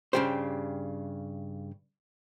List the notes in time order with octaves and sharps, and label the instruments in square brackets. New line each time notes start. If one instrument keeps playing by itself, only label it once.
[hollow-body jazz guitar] G2 A#2 C#3 G4 C5